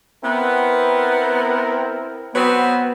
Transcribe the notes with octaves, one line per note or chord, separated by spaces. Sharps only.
B3 C4 E4 A#4
F#3 B3 C4 B4